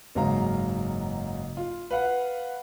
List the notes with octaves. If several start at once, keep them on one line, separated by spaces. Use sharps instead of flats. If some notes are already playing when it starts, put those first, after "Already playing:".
F#1 G#2 F#3 F5 A#5
F4
B4 F5 F#5